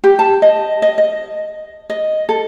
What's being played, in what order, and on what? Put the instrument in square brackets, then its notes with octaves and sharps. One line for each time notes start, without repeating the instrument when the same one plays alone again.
[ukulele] G4
A5
D#5
D#5
D#5
D#5
A4